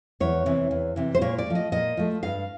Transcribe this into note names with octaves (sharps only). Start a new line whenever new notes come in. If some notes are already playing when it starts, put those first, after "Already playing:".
E2 C#5
C3 E3
E2
C3 E3
C5
A#2 C#5
D5
F3 A3
D#5
A#2 D#5
F3 A3
G2 F5